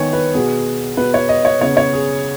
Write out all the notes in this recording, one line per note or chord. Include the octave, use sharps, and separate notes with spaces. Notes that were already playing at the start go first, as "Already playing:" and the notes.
Already playing: D#3 B3 C#5 G#5
B4
B2 B3 G#4
B2 B3 B4
C#5
D#5
C#5
C#3 B3 C#5
C#5
G#4